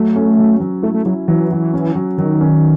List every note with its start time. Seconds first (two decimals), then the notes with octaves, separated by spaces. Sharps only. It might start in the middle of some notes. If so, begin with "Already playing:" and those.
Already playing: F#3 A3
0.16 C#4
0.38 F#3
0.60 F#3
0.83 A3 E4
0.94 A3
1.06 F#3 E4
1.28 E3 F#3
1.51 F#3
1.74 C#4
1.95 F#3
2.18 D#3 F#3
2.41 C#4